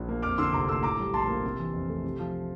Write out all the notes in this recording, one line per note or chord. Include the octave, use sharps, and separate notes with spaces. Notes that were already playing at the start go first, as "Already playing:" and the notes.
Already playing: A#1
A#3
F2 D6 F6
D3 C6 E6
F1 A#5 D6
A3 C6 E6
A2 A#5 D6
G3
A#1 A5 C6
A#3
C3
E3
F2
A3
C3
F3